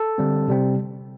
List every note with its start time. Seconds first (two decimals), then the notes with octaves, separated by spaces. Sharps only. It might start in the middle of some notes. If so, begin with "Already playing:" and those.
Already playing: A4
0.18 D3 G3 C4
0.48 C3 G3 C4